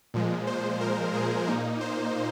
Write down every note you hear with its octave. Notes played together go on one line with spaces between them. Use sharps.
A#2 F3 G#3
C5
A#4
G#4
A#2 A#3 D#4
C5